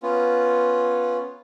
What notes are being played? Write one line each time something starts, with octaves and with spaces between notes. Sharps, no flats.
B3 C#4 F4